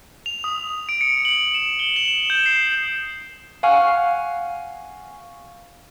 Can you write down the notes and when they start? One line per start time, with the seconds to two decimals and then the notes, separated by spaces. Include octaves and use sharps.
0.26 F7
0.44 D#6
0.89 D7
1.01 C#7
1.25 F#7
1.54 E7
1.79 G7
1.96 E7
2.30 G6
2.46 C7
3.63 F5 F#5 G#5 C#6 F6